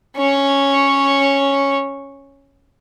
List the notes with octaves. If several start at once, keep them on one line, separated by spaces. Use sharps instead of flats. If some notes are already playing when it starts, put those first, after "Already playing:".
C#4 C#5